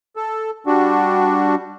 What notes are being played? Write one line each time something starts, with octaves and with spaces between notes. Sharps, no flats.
A4
G3 D4 F#4